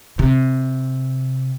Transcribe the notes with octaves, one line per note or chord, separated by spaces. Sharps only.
C3